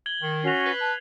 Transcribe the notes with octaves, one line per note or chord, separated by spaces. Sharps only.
G#6 F#7 G7
D#3
C#4 F#4 C7 F7
B4
A5